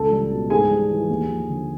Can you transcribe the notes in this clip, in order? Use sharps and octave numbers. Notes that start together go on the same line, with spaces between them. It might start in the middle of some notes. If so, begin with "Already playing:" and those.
Already playing: C#2 A4 A5
G3
B2
G#2 G#4 G#5
G3
E3
D#2
F3
D3